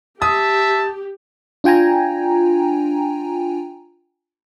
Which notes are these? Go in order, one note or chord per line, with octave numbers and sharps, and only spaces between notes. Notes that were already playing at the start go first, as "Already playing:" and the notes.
G4 E5 A5 D#6
D4 F4 G5 G#5 A#5